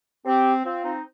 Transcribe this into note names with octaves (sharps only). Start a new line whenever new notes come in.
C4 G4
C4 F4
C4 D#4